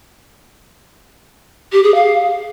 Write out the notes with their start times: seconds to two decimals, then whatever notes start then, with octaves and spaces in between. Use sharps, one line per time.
1.72 G4
1.83 G#4
1.94 F5